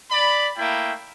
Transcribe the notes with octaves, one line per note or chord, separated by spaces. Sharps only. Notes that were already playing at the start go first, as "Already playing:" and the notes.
D5 B5
A3 A#3 E4 G5